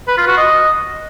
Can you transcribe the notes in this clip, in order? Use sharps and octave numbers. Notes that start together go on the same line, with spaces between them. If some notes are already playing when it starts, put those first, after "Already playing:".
B4
F4
F#4
D#5